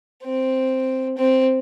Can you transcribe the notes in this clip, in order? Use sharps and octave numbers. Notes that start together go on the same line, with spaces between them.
C4
C4